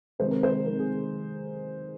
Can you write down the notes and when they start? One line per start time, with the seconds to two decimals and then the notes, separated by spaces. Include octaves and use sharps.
0.19 C3 D#3 G#3 C4 C5
0.31 A#4
0.43 C5
0.66 C3 D#3 G#3 C4 A#4
0.79 G#4